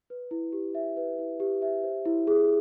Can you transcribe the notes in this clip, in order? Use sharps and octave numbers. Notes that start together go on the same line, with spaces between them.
B4
E4
G4
E5
B4
E4
G4
E5
C5
E4
G#4